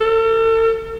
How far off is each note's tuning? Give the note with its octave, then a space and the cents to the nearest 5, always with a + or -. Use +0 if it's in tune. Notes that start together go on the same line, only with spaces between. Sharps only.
A4 +40